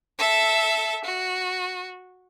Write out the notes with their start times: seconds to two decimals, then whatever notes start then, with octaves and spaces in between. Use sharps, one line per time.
0.19 A4 E5
1.05 F#4